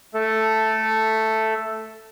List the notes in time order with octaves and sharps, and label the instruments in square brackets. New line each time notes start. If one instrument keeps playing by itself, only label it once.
[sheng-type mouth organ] A3 A4